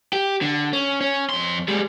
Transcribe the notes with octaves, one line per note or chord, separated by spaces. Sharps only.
G4
D3
C#4
C#4
F2 C6
G3 G#3